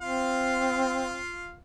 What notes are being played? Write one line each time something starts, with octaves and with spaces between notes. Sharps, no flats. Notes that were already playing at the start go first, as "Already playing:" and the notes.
C4 F4 F5